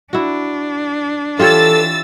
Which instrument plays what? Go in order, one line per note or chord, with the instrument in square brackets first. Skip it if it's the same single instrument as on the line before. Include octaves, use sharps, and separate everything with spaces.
[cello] D4 [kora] E4 F#4
[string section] E3 E6 A6 [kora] F4 G4 C#5 [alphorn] A4